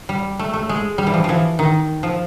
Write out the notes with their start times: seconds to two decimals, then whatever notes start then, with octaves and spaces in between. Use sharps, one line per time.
0.09 G3
0.39 A3
0.53 A3
0.69 G#3
0.98 G3
1.07 E3
1.14 F3
1.24 E3 F3
1.59 D#3
2.03 F3